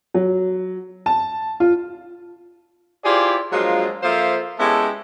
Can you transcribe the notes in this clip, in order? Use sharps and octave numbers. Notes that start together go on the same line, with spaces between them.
F#3
A5
F4
E4 F4 G4 G#4 C5 D5
F3 F#3 G#3 A#3 D4 F4
F3 A#3 A4 C5 E5 F5
G#3 B3 C#4 E4 G4 A4